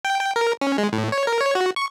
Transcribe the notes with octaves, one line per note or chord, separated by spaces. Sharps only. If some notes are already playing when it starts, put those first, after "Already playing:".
G5
G5
A#4
C#4
G#3
A2
C#5
A#4
C#5
F#4
C#6